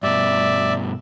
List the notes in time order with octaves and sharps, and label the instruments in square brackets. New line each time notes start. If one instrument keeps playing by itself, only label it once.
[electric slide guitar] G2 B2 [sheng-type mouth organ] D5 E5